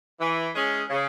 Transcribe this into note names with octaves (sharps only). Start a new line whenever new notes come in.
E3
G#3 C#4 G#4
C#3